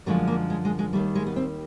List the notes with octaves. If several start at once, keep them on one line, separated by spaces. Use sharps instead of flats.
F#2 D3 F3 G#3 A3
A#3
G#3
G#3
G#3
D#2 D#3 G3 A3
G#3
B3
C4